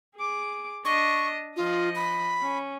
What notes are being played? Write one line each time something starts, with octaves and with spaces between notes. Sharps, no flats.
G#4 D6
D4 D#5 C#6
F3 F4 D#5
B5
C#4